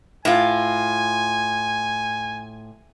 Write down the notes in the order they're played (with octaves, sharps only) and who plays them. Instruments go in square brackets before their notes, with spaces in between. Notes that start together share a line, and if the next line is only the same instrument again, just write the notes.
[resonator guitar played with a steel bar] A2 F4 [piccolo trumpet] G#5